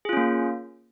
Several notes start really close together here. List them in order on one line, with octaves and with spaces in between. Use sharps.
G#4 F4 C#4 A#3